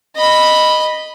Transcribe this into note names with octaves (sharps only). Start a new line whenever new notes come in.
D#5 B5